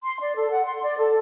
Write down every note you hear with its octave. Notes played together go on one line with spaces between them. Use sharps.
C6
D5
A4
F#5
C6
D5
A4